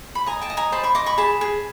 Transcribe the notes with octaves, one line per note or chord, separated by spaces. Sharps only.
B5
D#5 G#5 A#5
G5 A5
D#5
G#5 A#5
C5 A5 B5
B5 C#6
D#5 C6 D6
B5 C#6
G#4 A5 B5
G#4